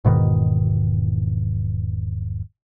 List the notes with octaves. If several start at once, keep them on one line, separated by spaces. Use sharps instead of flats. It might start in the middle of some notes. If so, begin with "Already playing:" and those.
E1 G#2 B2 D#3